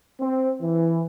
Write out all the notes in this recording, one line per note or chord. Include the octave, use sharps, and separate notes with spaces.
C4
E3